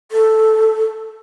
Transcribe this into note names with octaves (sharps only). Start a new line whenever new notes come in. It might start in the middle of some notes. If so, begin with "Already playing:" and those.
A4